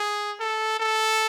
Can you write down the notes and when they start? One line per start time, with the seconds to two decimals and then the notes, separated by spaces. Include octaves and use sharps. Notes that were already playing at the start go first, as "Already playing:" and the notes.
Already playing: G#4
0.40 A4
0.80 A4